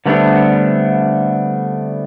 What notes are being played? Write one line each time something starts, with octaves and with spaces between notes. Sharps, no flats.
D3 G3 A3 B3 C4 D4